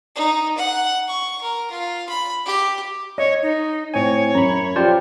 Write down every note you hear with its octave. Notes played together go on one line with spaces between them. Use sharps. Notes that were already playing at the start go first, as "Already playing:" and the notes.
D#4
F#5
C#6
A#4
F4
B5
G4
C#5 D#5
D#4
A2 C4 C#5 G#5
F#2 A#5 B5
F3 F4 G4 C5 D5